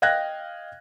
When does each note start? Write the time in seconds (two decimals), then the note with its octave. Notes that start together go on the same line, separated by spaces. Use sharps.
0.02 D#5 F5 G5 F#6 G#6 A#6